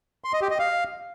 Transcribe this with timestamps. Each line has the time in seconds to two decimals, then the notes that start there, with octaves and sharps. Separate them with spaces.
0.24 C6
0.33 D#5
0.42 G4
0.50 D#5
0.59 F5